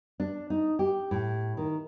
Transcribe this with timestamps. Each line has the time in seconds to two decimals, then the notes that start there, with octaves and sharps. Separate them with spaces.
0.20 D4
0.50 D#4
0.79 G4
1.11 A2
1.57 D#3